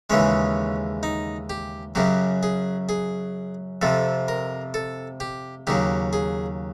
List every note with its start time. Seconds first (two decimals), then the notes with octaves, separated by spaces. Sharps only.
0.10 D#2 C#3 E3 G#3 C#4
1.03 D#4
1.50 G4
1.95 F#2 C#3 F#3 G4
2.43 G#4
2.89 G#4
3.82 F2 C3 F3 A4
4.28 A#4
4.74 A4
5.20 G4
5.67 D#2 C#3 F#3 G4
6.13 G#4